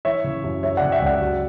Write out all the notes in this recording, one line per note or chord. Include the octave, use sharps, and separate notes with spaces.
E3 C#5 E5
C#3
F#2
F#3 C#5 E5
C#3 D5 F#5
E5 G5
C#2 D5 F#5
F#3